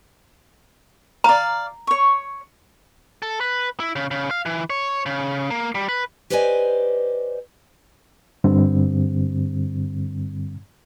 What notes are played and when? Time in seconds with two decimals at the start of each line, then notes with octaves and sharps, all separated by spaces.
1.24 D5 F5 A#5
1.87 C#5 C#6
3.22 A4
3.41 B4
3.80 E4
3.96 C#3
4.11 C#3
4.31 F5
4.46 E3
4.70 C#5
5.06 C#3
5.50 A#3
5.75 G3
5.89 B4
6.30 G4 B4 C5 D5 D#5 G#5
8.44 G2 D3 G3 C4